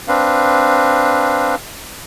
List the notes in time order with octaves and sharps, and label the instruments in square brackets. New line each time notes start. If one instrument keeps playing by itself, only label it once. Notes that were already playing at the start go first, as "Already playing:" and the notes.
[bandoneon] C4 D4 B4 F5